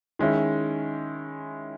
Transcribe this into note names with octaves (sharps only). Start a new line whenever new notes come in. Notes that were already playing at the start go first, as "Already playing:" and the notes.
D#3 G#3 C#4 E4